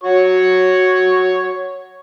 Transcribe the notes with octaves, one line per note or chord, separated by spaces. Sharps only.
F#4 C#5 C#6